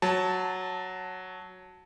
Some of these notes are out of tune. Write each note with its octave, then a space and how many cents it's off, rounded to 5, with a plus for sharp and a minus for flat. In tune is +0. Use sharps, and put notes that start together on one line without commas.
F#3 +0 A5 +5